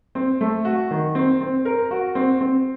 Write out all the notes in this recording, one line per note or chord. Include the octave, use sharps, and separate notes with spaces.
C4
A3
F#4
D#3
C4
C4
A#4
F#4
C4
C4